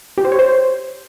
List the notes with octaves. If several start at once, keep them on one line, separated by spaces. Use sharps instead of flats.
G4
C5
C#5
C5